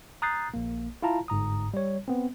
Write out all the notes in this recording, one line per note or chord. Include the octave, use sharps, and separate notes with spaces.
A#5 D#6 F#6 G6 A6 C7
A#1 A#3
E4 F4 F5 A5 A#5
G1 G#2 A#5 D#6
G3 C#5
B3 C4